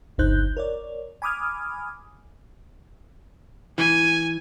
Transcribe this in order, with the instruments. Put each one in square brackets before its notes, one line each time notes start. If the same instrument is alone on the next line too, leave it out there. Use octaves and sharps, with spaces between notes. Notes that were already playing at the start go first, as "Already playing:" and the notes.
[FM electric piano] G1 C#2 D#4 C5 F#6 G6
A#4 C#5 D5
G#5 B5 D6 D#6 F6 G#6
[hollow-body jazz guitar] E3 [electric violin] G#5